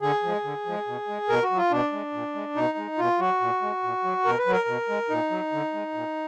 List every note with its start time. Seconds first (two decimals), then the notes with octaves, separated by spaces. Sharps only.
0.01 D3 G#4
0.23 F3 G#3
0.44 D3
0.65 F3 G#3
0.87 B2
1.08 G#3
1.29 B2 A#4
1.43 F#4
1.51 F#3
1.57 F4
1.71 B2 D4
1.92 G#3
2.13 A#2
2.35 G#3
2.56 B2 D#4
2.77 G#3
2.98 B2 F4
3.20 F#3 F#4
3.41 A#2
3.62 G#3
3.83 A#2
4.04 F#3
4.25 B2 A#4
4.38 B4
4.46 F#3
4.52 A#4
4.67 B2
4.89 G#3
5.09 A#2 D#4
5.31 F#3
5.52 D3
5.73 G#3
5.94 A#2